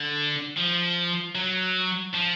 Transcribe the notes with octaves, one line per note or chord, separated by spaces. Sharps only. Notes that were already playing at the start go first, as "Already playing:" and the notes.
Already playing: D3
F3
F#3
F3